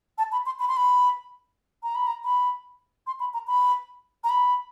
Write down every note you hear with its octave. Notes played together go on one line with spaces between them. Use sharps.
A5
B5
C6
B5
C6
B5
A#5
B5
A#5
B5
C6
B5
A#5
B5
A#5
B5